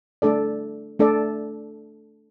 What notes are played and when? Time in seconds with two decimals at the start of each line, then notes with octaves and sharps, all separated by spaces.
0.22 A3 D4 A4 D5
0.99 A3 D4 A4 D5